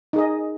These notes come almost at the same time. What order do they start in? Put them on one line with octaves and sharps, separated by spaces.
D#4 G#4 D#5